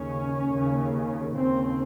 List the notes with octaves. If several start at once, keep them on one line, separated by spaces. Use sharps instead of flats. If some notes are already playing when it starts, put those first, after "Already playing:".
Already playing: D#2 C#3 C#4
D#2 C#3
D#2 C#3 C4